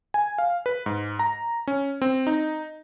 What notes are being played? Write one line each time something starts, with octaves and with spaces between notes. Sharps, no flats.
G#5
F5
B4
G#2
A#5
C#4
C4
D#4